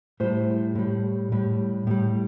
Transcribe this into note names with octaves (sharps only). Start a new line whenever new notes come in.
A2 G3 C5
A2 G3
A2 G3
A2 G3